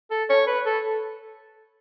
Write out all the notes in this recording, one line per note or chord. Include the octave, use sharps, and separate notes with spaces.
A4
C#5
B4
A4